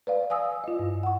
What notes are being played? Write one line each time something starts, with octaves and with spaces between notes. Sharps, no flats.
B4 D5 F5
F5 G#5 D#6 E6
F4 D#5
G2
F#5 C#6